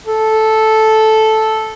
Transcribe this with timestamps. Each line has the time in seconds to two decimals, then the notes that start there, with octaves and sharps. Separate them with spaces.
0.06 A4